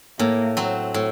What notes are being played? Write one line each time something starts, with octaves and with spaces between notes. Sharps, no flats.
A2 A#3
F#3 C4
A2